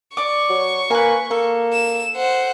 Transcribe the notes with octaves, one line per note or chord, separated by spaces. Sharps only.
D5 C#6 D6
F#3
A#3 B4 G#5
A#3 A4
E7
C5 F#5